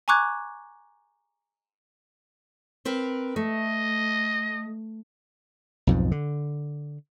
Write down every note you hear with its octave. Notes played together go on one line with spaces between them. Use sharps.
G#5 A#5 C#6 D6 F#6 G#6
C4 A#4 B4
A3 D#5
B1 F2 G#2
D3